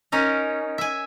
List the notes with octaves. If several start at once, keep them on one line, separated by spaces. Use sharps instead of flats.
C#4 D#4 A#4
E5 G#5